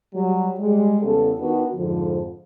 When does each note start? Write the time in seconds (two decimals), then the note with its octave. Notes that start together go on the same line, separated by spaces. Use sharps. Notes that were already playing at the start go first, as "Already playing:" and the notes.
0.15 F#3 G3
0.58 G3 G#3
1.02 E2 C#3 G3 B3 A4
1.39 D#3 B3 D4 F#4
1.76 F2 G#2 D3 F3